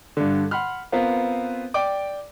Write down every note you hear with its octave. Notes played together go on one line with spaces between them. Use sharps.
G2 D3
F#5 B5 C6 F6
B3 C4 F4 A#4 B4 F5
D5 G5 D6